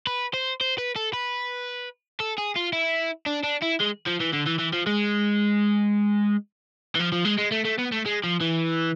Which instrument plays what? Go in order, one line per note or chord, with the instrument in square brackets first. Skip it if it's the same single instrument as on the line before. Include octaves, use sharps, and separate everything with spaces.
[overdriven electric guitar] B4
C5
C5
B4
A4
B4
A4
G#4
F4
E4
D4
D4
E4
G#3
F3
E3
D3
E3
E3
F3
G#3
E3
F3
F3
G#3
G#3
A3
A3
B3
A3
G#3
F3
E3